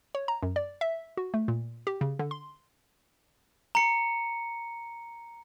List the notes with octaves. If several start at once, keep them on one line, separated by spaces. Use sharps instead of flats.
C#5
A#5
F#2
D5
E5
F#4
A3
A#2
G4
C#3
D3
C6
A#5 C#7